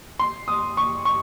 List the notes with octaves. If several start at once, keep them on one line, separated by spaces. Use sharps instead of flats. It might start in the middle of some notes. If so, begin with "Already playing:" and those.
C6
D#6
C#6
C#6